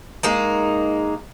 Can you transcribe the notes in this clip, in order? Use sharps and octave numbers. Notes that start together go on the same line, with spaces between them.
G#3 A#3 D#4